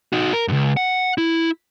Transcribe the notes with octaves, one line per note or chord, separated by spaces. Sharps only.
D#4 F#4
A#4
C#2 F#2
F#5
E4